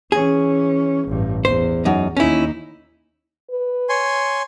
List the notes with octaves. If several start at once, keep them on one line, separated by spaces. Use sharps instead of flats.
E3 C#4 G#4
A1 G2
E2 C5
F#2 D#4
D#2 C#4 D#4 E4
B4
C#5 G#5 C6